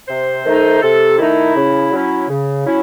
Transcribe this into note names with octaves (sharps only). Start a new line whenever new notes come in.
C3 C5
D#3 A3 D#4
C3 A4
D#3 A3 D#4 E4
C#3
F#3 C#4 E4
C#3
F#3 C#4 E4